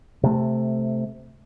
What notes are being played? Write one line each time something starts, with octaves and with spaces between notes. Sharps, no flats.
C3 A3